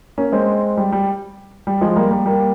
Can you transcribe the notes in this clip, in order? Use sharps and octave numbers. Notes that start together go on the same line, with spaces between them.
A#3 C#4
G#3 C4
G3
G3
G3
F3 G#3
G3 A#3
G3 A#3
G3 A#3